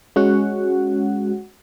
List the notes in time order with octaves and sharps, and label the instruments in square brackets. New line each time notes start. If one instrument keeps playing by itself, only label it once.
[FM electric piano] G#3 C#4 F#4 F#5